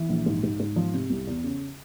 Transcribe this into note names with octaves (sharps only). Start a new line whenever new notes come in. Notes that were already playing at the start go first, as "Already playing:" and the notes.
Already playing: E3
A#1
G#2
G#2
G#2
F3
C3
C2
E2
C#3